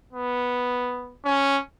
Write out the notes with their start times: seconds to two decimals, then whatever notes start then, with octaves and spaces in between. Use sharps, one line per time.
0.13 B3
1.25 C#4